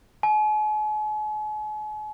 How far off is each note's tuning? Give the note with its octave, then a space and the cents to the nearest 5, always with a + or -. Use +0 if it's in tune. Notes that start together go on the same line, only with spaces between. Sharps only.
G#5 +45